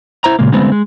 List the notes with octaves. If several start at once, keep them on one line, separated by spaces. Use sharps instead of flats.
E4 C5 A#5
A#2 C#3 G#3 A#3
D3 G3 G#3 B3 C4
G#3